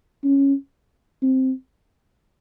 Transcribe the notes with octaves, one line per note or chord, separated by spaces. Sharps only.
C#4
C4